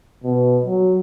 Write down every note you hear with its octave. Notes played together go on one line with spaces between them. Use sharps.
B2
F#3